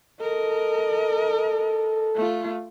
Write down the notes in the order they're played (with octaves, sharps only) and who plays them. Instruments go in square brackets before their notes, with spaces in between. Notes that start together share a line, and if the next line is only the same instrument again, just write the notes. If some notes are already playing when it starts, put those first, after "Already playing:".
[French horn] A4 [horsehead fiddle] A#4 D#5
[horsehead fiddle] A3 F4